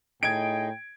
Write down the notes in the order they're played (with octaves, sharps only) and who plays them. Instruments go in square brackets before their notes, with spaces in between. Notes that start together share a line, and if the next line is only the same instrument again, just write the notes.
[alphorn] A2 [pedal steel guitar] D#4 G#4 D#5 [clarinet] G5 [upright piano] G#6 D7